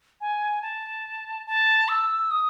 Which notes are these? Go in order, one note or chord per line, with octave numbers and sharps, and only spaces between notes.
G#5
A5
A5
E6
D#6